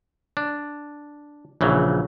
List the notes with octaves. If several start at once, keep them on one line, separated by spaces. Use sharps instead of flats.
D4
A#1 C#3 E3 F#3